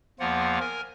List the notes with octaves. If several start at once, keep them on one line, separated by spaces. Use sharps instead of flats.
E2 F3 A#3 F4 F#5
A#4 G#5